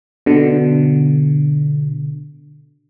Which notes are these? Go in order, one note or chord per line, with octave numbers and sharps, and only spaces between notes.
B2 D3